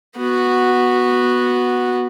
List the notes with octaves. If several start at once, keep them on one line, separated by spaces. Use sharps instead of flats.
B3 F#4